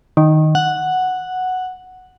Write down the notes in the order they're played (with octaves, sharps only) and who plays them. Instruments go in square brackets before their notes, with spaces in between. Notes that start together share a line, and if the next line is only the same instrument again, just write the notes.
[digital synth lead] D#3
F#5